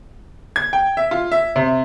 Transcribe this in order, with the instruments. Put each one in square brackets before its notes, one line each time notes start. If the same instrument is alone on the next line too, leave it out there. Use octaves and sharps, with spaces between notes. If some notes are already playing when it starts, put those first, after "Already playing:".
[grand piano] G#6
G5
E5
F4
E5
C3